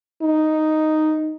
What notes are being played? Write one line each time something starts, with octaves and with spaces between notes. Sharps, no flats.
D#4